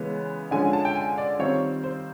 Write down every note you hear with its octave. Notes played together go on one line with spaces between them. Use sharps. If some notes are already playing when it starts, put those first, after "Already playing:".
Already playing: C#3 E3 G#3 B3
D3 F3 G#3 C#4 G#5
A5
G5
G#5
D5
D#3 G3 C4 F4 C#5
C5